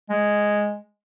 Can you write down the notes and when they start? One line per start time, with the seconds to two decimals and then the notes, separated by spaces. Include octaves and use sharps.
0.09 G#3